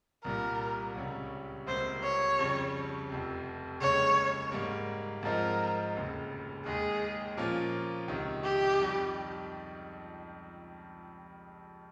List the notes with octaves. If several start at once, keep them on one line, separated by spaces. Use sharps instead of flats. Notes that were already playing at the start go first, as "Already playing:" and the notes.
C2 A#2 G3 A#4
C#2 C3 G3 C#4
C#2 C3 G3 A#3 C5
C#5
F2 C#3 G3
F1 F2 C3
F1 D#2 C#3 G#3 C#5
G#2 G3 A#3
G#2 F3 C4 D#4 A#4
F1 D#2 C#3
D#2 D#3 G#3 G#4
A#2 F3 A#3 C#4 F4
C#2 C3 D#3
G4
F2 D#3 G3